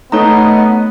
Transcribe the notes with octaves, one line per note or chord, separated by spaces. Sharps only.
A3 B3 D#4 C#5 D#5 A#5